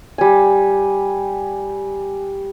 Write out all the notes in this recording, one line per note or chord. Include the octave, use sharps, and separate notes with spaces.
G3 G#5